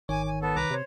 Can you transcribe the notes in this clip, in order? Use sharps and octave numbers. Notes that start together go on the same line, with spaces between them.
G#1 D#3 C#5 G#5 D6
G#5
B3 A4 A5
C2 B4 A#5 D6
C3 C5 C#5